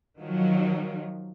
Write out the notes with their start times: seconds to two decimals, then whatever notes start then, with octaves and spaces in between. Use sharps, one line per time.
0.19 D#3 F3 F#3